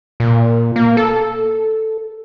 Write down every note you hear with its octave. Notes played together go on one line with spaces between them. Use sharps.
A#2
A#3
A4